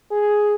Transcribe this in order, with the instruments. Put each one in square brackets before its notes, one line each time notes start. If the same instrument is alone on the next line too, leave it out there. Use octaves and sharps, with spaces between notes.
[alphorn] G#4